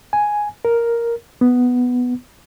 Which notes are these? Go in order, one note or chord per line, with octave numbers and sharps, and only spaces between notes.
G#5
A#4
B3